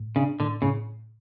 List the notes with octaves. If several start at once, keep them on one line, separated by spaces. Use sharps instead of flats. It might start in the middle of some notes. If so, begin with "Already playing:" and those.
Already playing: A2
C#3 D4
A2 D3
A2 C#3